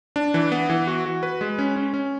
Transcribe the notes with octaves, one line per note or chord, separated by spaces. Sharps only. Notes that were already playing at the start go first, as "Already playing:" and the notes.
D4
E3
B3
E3
F#4
F#4
B4
G#3
C#4
C#4
C#4